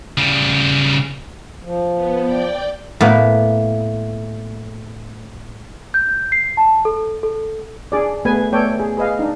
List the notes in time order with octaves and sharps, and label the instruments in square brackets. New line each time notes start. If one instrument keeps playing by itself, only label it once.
[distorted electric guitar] C#3 G3
[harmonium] F3
[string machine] B3
D5 G5
[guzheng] A2 A#3 B3
[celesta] G6
C7
A5
A4
A4
[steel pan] D4 G#4 D5
A3 B3 G#4 B4 G#5
A3 B3 A4 C#5 D5 G5
G#4
G#4 B4 D#5 F5
D4 D#4